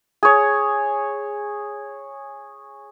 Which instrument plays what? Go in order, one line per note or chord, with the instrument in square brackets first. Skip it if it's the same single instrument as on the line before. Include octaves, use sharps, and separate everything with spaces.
[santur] G#4 C#5